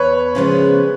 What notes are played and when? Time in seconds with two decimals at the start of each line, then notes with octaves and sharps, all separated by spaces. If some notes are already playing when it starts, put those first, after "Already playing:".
Already playing: E2 B4 C#5
0.35 C#3 F3 G#3 B3